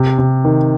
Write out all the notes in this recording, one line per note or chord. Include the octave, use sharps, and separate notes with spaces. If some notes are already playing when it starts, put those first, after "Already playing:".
Already playing: C3
C3
D#3